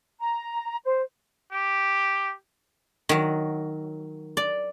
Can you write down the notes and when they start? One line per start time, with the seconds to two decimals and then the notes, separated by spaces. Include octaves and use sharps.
0.20 A#5
0.84 C5
1.52 G4
3.09 D#3 F#3
4.37 D5